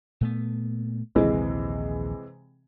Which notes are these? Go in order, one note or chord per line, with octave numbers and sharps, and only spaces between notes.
A#2 A3 B3
A#1 D#2 C3 E3 G#3